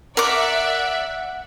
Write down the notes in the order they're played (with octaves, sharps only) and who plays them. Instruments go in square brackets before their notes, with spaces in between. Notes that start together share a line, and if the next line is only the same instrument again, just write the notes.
[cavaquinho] A#4 D6 [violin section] D5 E5 [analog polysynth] F#5